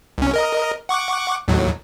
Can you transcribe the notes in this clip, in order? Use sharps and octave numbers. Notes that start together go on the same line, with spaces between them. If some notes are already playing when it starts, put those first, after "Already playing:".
C2 C#4
A#4 D#5
F#5 C#6 D6
D#2 A2 F#3